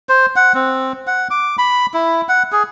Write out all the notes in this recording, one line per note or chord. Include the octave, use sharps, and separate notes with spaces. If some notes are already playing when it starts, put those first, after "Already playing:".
C5
F#5
C4
F#5
D6
B5
E4
F#5
G#4